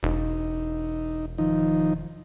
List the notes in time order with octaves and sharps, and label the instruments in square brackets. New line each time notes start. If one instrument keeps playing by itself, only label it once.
[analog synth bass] E1 [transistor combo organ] D#4
[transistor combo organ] D#3 F3 D#4